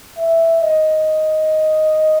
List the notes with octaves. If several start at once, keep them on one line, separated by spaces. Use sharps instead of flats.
E5
D#5